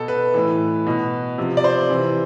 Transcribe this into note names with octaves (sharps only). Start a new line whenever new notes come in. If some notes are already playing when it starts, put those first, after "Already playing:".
Already playing: B2 A4
B4
A2 E3
B2
C3 F3
D5
C5
C3 E3